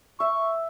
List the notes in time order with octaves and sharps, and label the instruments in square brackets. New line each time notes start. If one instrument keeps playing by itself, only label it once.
[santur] E5 [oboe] C#6